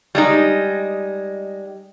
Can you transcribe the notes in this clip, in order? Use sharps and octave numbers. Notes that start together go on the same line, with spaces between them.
G3 G#3 D#4